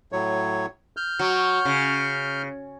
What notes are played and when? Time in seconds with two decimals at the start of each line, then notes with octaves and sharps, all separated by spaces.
0.12 A2 F#3 C#5
0.97 F6 G6
1.19 F#3
1.65 C#3